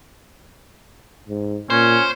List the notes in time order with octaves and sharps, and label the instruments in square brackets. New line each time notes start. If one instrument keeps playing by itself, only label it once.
[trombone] G#2
[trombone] A#2 [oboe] C#4 [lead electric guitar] C5